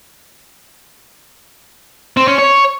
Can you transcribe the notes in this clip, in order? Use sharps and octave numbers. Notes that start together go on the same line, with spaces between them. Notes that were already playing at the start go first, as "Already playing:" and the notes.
C4
C#4
C#5